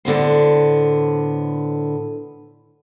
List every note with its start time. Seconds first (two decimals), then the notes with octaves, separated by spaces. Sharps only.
0.05 A2 D3 B3 C5